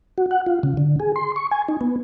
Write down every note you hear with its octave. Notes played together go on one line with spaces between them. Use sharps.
F#4
F#5
F4
C#3
D3
G#4
C6
C#6
G#5
D#4
B3